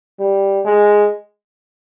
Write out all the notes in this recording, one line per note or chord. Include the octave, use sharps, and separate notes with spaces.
G3
G#3